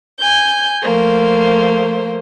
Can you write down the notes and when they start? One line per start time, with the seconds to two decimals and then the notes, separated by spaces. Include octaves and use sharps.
0.19 G#5 G6
0.83 F3 A3 A#3 C5